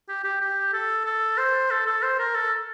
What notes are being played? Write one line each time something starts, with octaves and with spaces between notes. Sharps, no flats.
G4
G4
G4
A4
A4
C5
A4
A4
C5
A#4
A4